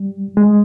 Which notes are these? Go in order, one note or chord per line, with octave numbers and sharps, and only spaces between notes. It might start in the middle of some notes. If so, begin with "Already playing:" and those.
Already playing: G3
G#3